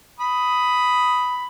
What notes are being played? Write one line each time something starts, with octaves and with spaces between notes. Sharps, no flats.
B5 D#6